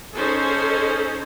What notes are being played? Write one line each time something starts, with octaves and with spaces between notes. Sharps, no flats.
C#4 D#4 G#4 A4 C5